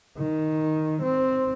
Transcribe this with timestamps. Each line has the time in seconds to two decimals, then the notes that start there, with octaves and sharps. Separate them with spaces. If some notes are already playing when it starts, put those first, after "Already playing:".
0.17 D#3
1.02 C4